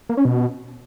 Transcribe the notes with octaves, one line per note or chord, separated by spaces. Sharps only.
A#3
C#4
B2